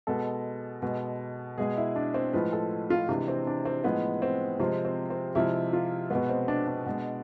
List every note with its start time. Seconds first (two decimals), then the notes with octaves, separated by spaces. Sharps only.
0.07 B2 G#3 A4
0.82 B2 G#3
1.58 B2 G#3 G#4
1.77 E4
1.96 D4
2.14 C4
2.33 A2 F3 G#3 B4
2.52 A4
2.90 F4
3.09 C3 E3 G#3 D4
3.28 C4
3.47 D4
3.65 C4
3.84 A2 F3 G#3 B3
4.22 C4
4.59 C3 F3 G#3 C4
4.85 C4
5.10 C4
5.35 C3 F3 G#3 E4
5.73 F4
6.10 B2 G#3 B3
6.29 C4
6.48 D4
6.67 D4
6.86 B2 G#3